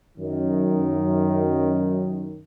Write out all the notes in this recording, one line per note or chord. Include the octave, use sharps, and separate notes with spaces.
F#2 D#3